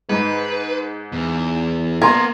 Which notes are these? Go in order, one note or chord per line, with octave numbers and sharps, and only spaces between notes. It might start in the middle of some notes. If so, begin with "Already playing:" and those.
G#2 B4
E2
A#3 B3 A#4 C6 G#6